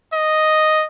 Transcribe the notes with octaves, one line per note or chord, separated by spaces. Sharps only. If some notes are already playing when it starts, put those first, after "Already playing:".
D#5